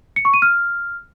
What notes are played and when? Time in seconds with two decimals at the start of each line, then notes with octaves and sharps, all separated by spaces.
0.16 C#7
0.25 C#6
0.34 D#7
0.42 F6